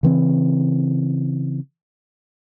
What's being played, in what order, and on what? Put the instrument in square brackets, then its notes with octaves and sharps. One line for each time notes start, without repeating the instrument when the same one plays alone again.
[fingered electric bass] C#3 E3 C4